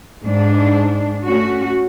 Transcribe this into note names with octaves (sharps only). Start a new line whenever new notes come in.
G#2 D4
A3 C#4 F#4